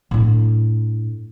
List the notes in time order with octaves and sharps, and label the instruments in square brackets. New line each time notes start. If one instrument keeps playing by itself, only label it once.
[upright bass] A2 D4